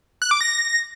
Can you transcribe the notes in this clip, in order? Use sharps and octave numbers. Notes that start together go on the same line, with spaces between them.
F#6
D6
A#6